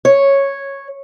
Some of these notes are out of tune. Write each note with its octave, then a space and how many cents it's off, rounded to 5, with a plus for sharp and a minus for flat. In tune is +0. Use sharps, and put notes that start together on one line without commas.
C#5 -5